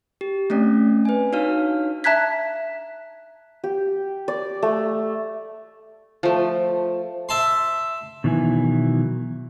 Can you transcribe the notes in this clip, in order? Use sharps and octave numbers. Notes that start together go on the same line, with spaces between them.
G4
A3 C4 C#4 D5
B4 G#5
D4 D#4 F#4 C#5 F5 F6
E5 A5 A#5 F#6 G#6 B6
G4
D5
A3
F3 A3
E5 A5 C6
B2 D#3 E3 F#3 E4 G#5